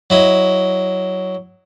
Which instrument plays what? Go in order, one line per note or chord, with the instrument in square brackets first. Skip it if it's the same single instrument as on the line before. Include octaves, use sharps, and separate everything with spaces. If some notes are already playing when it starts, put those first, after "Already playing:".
[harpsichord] F#3 E4 D#5